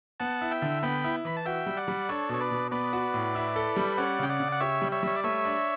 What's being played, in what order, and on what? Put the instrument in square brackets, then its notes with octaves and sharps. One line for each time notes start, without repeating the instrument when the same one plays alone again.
[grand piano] B3 [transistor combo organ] F#5 A5
[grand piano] E4
[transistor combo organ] E5 G5
[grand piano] D3
[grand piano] B3 [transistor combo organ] G5 B5
[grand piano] E4
[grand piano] E3 [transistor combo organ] B5
[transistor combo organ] A5
[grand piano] F#4 [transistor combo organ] E5 G5
[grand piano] G3
[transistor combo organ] D5 F#5
[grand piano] G3
[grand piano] D4 [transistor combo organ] A4 C#5
[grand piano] B2 [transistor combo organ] C#5
[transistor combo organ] B4 D5
[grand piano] B2
[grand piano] B3 [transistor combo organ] B4 D5
[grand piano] F#4
A2
E4
A4
G3
[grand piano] C#4 [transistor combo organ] D5 F#5
[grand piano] C#3 [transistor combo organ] G5
[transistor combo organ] D5 F#5
[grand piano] C#3
[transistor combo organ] F#5
[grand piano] G4 [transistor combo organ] C#5 E5
[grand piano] G3
[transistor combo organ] C#5 E5
[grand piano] G3 [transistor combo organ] C#5
[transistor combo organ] D5
[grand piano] A3 [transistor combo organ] C#5 E5
[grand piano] D4